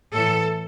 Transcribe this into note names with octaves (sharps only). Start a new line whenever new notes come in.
A2 E3 A4